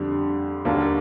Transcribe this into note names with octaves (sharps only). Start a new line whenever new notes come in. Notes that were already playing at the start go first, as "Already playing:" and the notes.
Already playing: F2 D3 G3
D#2 D3 G3 A#3 D4